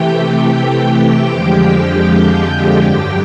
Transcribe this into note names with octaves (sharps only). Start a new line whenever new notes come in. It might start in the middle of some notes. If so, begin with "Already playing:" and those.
Already playing: C3 E3 A3 G4 G5
F2 D3 F3 G#3 G4 G5
G2 D3 F#3 G4 G5